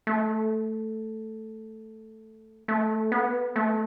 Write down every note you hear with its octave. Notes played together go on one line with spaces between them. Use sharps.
A3
A3
B3
A3